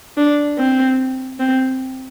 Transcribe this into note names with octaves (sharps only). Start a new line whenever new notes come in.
D4
C4
C4